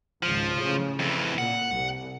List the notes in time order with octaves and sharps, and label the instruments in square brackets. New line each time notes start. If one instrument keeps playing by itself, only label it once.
[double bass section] G#1 C#2 [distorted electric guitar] F3
[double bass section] A2 C#3
[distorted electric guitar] F2 E3
[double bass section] A#2 [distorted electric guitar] F#5
[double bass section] C2